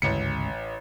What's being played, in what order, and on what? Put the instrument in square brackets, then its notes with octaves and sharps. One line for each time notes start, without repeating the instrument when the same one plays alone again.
[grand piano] A1 C#7 [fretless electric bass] D2 G#2 C#3